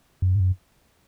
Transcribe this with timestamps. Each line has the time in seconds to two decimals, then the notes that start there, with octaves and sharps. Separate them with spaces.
0.22 F#2
0.35 G#2
0.40 F#2